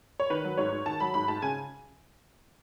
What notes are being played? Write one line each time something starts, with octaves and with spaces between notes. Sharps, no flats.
C#5
D#3 B4
F#3
G#2 C#5
G#2
D#3 A5
F#3 B5
G#2 B5
G#2 A5
C#3 G#5